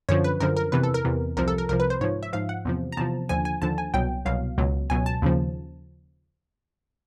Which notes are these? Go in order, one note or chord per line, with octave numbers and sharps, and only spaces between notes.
F#2 D3 F3 C#5
B4
F#2 D3 F3 A#4
A#4
E2 C3 E3 B4
A4
A#4
E2 C3 E3
C2 C3 F3 A#4
A4
A#4
C2 C3 F3 A#4
B4
C5
G#2 F3 C#5
E5
G#2 F3 F5
F#5
E2 C3 F3
A#5
E2 C3 F3 A5
D#2 D3 F3 G#5
G#5
D#2 D3 F3 A5
G#5
C2 B2 F#3 G5
C2 B2 F#3 F5
C#2 B2 F#3
C#2 B2 F#3 G#5
A5
D#2 C#3 F3